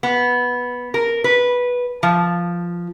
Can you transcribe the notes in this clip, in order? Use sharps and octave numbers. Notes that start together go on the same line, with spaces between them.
B3
A#4
B4
F3